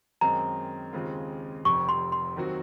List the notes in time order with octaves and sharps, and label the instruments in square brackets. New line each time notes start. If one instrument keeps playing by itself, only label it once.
[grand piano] F#2 D#3 G#3 C4 D#4 [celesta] A#5
[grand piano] D#2 C#3 G#3 C4 F4
[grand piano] F1 F2 C3 [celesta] C#6
[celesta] C6
C6
[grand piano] D#2 D#3 F#3 C4 F#4